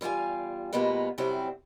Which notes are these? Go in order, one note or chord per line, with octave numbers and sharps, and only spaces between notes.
E2 G3 F4 F5 G#5
B2 G3 G#3 A#3 B3 F4
F#2 C3 F#3 G3 C4 E4